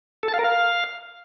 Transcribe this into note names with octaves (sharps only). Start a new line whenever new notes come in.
A4
A5
F5
A#4
F5